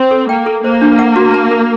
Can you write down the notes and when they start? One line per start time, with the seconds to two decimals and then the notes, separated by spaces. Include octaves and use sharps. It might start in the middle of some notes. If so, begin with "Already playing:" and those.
Already playing: C4
0.11 A4
0.29 A#3 G5
0.46 A4
0.64 A#3 C5
0.82 D4
0.99 F#5
1.16 F#4
1.34 A5
1.51 A#4